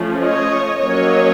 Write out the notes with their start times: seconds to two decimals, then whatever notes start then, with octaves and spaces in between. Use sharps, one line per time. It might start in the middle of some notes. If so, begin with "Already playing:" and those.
Already playing: F3 A3 C#4
0.20 C#5 D#5
0.79 F#3 A#3 C#4 C#5 D#5